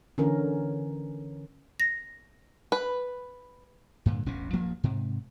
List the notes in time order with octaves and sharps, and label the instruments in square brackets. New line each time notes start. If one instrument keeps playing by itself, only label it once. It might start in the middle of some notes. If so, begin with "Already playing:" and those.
[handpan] D3 E3 C#4 A#4
[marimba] A#6
[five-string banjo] B4
[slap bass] G2 A#2 D3
E1 A1 B2 C#4
D#1 G2 F3 A#3
G#2 C3